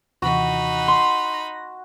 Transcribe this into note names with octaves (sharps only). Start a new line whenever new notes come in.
D#2 C3 E3 D#4 F#4 B5
C6
A#6